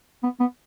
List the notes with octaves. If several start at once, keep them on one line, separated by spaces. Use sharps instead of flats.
B3
B3